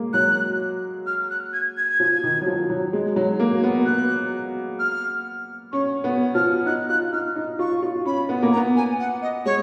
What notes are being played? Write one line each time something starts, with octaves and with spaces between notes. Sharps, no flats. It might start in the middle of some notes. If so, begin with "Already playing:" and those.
Already playing: G#3 A#3
F#3 F#6
F6
F#6
G#6
G#6
F3
D#3
F#3
F3
F#3
G#3
F#3
A#3
B3
B3 F#6
F6
C#4 C#6
B3
F3 F6
D#4 F#6
F4 F#6
D#4 F6
D#4
F4 C#6
F4
C#4 B5
B3
A#3
A#5
B3
G#5
F#5
D#5
G#3 C#5